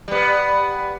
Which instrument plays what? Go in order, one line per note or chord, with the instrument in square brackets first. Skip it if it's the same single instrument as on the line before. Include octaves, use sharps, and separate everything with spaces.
[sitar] G3 B3